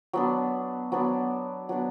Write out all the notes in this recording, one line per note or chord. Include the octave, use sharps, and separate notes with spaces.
F#3 B3 D4
F#3 B3 D4
F#3 B3 D4